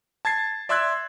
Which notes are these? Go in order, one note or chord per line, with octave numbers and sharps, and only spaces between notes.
A5 G#6 A6 C7
D5 E5 C6 E6 F#6 G#6